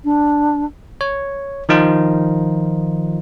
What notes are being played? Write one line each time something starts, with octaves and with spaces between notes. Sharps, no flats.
D4
C#5
D#3 F3 D#4 F4